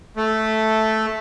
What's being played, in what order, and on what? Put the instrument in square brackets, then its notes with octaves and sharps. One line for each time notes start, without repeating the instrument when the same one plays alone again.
[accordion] A3